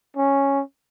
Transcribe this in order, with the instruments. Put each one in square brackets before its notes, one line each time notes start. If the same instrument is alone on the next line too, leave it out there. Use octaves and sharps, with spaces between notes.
[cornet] C#4